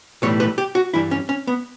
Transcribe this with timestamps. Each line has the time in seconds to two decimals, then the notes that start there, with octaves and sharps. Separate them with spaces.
0.22 B1 A2 E3 G3 C#5
0.40 B4
0.58 G4
0.75 F#4
0.94 G2 E3 G3 E4
1.11 C#4
1.29 C#4
1.47 B3